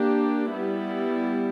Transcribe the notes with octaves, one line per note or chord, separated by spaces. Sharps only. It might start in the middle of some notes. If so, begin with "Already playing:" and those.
Already playing: A#3 D4 G4
G3 B3 E4